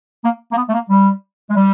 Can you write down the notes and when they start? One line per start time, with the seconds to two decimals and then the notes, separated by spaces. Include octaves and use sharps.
0.24 A#3
0.52 A#3
0.57 B3
0.68 A3
0.74 A#3
0.90 G3
1.50 G#3
1.56 G3